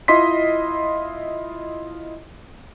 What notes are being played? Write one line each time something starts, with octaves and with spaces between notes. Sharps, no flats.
E4 F4 D#5 C6 B6